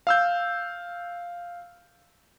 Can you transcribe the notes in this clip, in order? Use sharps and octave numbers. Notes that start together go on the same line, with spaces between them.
F5 E6 G6